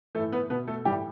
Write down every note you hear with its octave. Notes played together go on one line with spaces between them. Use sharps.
A2 E3 A3 A4
B3 B4
B2 B3 B4
A3 A4
E3 G3 G4
A2